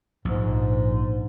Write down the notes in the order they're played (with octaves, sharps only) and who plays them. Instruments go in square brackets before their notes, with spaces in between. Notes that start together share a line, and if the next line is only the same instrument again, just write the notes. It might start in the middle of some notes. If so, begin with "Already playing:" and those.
[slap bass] A#1 [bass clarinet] G#2